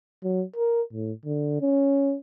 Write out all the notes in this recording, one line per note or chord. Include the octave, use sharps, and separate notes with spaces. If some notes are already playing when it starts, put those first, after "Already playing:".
F#3
A#4
A2
D3
C#4